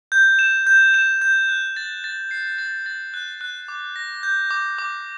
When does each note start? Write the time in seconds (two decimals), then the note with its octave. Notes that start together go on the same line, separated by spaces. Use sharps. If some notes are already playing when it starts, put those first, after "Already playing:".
0.12 G6
0.39 E7
0.67 G6
0.94 E7
1.21 G6
1.49 F#6
1.76 A6
2.04 A6
2.31 C7
2.58 A6
2.86 A6
3.14 F#6
3.41 F#6
3.68 D6
3.96 A#6
4.23 G6
4.51 D6
4.78 D6